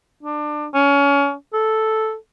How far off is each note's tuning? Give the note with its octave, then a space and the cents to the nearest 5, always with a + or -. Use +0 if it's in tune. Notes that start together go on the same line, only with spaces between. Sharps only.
D4 +25
C#4 +25
A4 -5